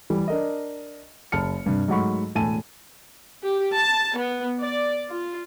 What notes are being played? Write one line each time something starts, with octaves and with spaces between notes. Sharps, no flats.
E3 G3
D4 A#4 D#5
F#1 A5 F6 C#7
G2 C3
G#2 F#3 A3 F#5 B5 C#6
E1 A2 G#5 A5 D#7
G4
A5
B3
D5
F4